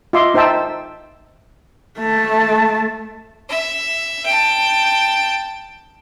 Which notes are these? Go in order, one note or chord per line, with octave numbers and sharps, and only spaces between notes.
F4 D#5 E5 C6 D6
D#4 C5 E5 G5 A5 E6
A3 A5
E5
G5 A5